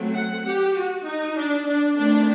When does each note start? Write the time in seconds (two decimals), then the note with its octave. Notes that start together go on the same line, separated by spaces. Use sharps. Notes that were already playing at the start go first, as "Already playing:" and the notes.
Already playing: F#3 A3 C4
0.12 F#5
0.43 G4
0.73 F#4
1.03 D#4
1.34 D4
1.64 D4
1.95 D#3 A3 C4 D4